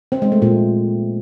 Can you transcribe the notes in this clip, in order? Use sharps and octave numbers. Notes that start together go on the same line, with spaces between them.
C4
G#3
A3
A#2